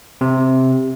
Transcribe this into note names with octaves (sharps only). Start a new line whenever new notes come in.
C3